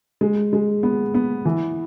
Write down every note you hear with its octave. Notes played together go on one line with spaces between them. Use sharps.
G#3
G#3
B3
B3
E3